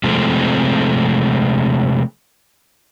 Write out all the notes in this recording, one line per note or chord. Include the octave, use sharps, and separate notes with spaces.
C3 F3 G#3 A3 C4